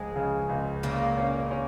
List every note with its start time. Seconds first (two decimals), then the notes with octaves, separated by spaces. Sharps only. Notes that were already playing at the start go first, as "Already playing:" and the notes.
Already playing: C#2 F3 G#3
0.16 C#3
0.49 C#2
0.83 A#2 C#3 A#3
1.17 C#4
1.51 C#4